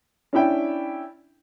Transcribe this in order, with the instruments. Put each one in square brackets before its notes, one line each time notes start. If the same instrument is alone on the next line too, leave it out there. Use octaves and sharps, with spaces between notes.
[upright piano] C#4 D4 E4 G5